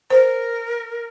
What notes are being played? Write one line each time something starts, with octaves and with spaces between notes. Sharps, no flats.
A#4 C5